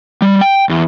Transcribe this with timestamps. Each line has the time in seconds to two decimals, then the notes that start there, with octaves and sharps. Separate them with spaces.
0.22 G3
0.41 G5
0.69 E2